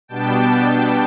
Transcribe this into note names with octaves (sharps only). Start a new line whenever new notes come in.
B2 G3 B3 D4 G5 A5